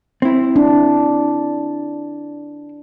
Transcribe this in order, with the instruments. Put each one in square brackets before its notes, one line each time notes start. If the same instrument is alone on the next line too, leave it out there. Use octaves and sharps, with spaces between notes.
[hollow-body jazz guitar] C4 E4
[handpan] D4